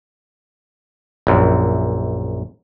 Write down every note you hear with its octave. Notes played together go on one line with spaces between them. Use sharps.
A#1 F#2